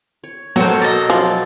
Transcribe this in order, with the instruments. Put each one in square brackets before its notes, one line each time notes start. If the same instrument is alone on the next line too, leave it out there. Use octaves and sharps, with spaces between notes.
[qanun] C#5
[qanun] B2 A#3 A4 [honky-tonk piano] F#3 [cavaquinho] F#4 C5
[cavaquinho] D5 D#5
[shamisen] F3